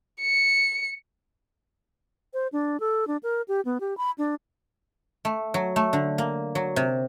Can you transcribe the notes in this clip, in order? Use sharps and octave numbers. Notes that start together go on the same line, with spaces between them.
C#7
C5
D4
A4
D4
A#4
G4
B3
G4
B5
D4
A3
F#3
A3
D3
A#3
F#3
C3